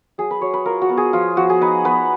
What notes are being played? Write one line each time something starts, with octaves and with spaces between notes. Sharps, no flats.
F#3 G#4
B4
F#3 C#5
B4
F4 A#4
F#4
B3
G#4
F3 F4
F3 F#4
G#4
D#4 B4
B3 B4